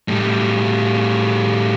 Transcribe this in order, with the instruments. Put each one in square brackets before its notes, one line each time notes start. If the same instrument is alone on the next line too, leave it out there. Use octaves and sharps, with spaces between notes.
[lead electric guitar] A2 G3